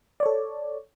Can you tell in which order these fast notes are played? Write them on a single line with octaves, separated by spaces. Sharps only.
D5 C#5 A4